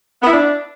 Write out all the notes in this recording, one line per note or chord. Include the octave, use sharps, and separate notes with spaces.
B3
E4
D4